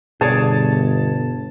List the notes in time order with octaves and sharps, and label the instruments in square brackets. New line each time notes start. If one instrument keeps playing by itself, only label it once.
[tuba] G1 [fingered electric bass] B2 [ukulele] G#4 C#5 D5 [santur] A5